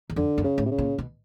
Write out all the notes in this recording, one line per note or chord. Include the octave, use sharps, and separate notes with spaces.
E2
F2 D3
F#2
C#3
A2
C3
C#3
A#2
B2